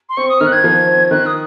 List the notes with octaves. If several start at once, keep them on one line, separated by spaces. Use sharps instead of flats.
C6
C4 C#6
D#6
D#3 F6
F#6
G#6
F3
C4
D#3 F#6
D#6